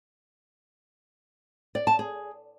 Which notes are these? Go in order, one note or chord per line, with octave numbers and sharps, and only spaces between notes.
D5
A5
G#4